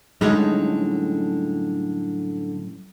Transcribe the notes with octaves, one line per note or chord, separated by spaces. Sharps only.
F#2 A2 D3 G3 G#3 D#4